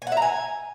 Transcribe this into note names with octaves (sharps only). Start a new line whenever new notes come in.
G#5
F#5
E5
A#5
G#5